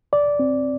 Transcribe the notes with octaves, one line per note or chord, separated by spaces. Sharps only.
C2 D5
C4